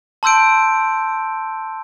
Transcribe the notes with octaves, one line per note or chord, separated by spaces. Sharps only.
A5 C6 E6 G6 D7